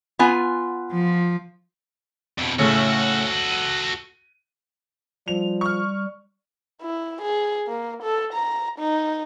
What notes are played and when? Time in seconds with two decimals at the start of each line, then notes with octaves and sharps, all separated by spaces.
0.19 B3 F4 G#5
0.91 F3
2.38 F2 B2
2.59 A2 C#3 A3 F#4 A4
3.52 D#7
5.28 F3 G3 F7
5.61 C#6 F6
6.81 E4
7.22 G#4
7.68 A#3
8.03 A4
8.33 A#5
8.79 D#4